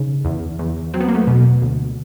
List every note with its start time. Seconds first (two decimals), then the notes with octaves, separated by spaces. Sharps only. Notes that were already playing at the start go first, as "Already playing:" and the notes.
Already playing: C#3 D#4
0.25 E2
0.59 E2
0.94 F#3 C4
1.01 B3
1.08 A#3
1.15 A3 B3
1.27 B2
1.62 D2